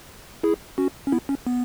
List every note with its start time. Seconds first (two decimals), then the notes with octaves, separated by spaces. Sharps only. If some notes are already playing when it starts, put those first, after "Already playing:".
0.43 E4 G#4
0.78 C#4 F#4
1.07 C#4
1.12 B3 E4
1.29 C#4
1.47 B3